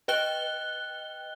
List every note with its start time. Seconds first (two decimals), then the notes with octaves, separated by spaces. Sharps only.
0.08 B4 D#5 G5 F#6 G7